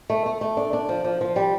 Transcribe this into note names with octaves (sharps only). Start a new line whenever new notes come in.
A3
A3
A3
D4
D4
F3
F3
F3
G3